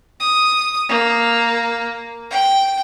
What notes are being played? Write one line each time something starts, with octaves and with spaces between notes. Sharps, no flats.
D#6
A#3
G5